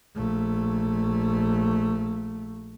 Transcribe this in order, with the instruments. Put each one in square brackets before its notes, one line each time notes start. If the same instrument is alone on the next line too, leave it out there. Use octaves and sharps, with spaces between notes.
[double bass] A#1 A3